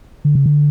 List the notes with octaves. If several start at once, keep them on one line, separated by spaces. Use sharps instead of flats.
D3
C#3
D3